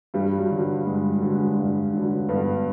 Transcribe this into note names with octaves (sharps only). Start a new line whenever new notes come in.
G2 G3
F#3
D3 F#3
G3
G2 G#3
G3
D3 F#3
G#3
G3
G2 G#3
D3 F#3
G2 B3